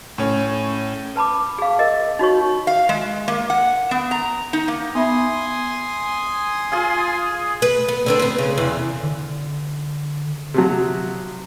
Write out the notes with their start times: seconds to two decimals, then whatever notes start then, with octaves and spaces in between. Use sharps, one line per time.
0.18 A2 C#4
1.16 B4 A5 B5 D6
1.58 G#4 F5
1.79 A#4 D#5
2.19 D#4 F#4 C#5 C#6
2.67 F5
2.89 G#3
3.28 A#3
3.50 F#5
3.91 B3
4.11 A#5
4.53 D#4
4.68 A#3
4.95 B3 E5 G#5 B5 C6 D#6
6.72 F4 G#4 F5
7.62 B4
7.89 B3
8.06 D3 C4 D4
8.19 B3 C4
8.38 C#3
8.58 E2 C3
9.03 D3
10.54 C3 F3 F#3